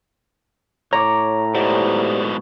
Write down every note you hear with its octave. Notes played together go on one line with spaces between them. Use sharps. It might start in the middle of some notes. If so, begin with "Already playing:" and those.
A2 C#5 A#5 C#6 D6
G#2 B2 G4 C5 D5